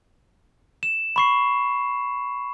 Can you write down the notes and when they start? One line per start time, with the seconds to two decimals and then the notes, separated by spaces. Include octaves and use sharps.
0.83 E7
1.16 B5 C#6 C7